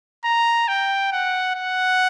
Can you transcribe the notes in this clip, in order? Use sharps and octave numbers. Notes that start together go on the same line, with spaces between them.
A#5
G5
F#5
F#5